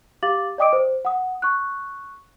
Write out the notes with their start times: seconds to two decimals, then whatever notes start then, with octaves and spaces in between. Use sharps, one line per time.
0.23 G4 F5 D6 A6 F#7
0.58 D5 D#5 G5 D6 D#6 D7
0.73 C5
1.05 F#5 D#6
1.42 C#6 F#6